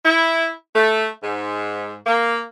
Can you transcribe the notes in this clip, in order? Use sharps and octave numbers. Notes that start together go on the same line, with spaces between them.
E4
A3
G#2
A#3